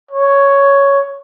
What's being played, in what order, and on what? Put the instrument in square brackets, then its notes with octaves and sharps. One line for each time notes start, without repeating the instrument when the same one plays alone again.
[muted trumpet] C#5